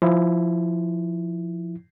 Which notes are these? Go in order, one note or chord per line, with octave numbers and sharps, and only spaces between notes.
F3 E4